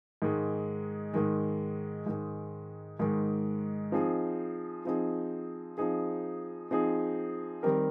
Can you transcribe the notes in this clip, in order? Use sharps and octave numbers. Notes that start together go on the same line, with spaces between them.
G#2 D#3 G#3
G#2 D#3 G#3
G#2 D#3 G#3
G#2 D#3 G#3
F3 C4 D#4 G#4
F3 C4 D#4 G#4
F3 C4 D#4 G#4
F3 C4 D#4 G#4
D#3 G3 C4 G4 A#4